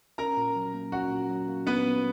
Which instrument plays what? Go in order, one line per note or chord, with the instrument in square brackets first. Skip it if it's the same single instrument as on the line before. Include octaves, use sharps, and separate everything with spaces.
[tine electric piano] C#4 [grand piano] A#4 A#5
[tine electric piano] A#2
F#3
A#3
[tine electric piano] C#4 [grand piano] F#4 F#5
[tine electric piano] A#2
F#3
A#3
[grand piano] B3 B4 [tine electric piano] C#4
[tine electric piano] A#2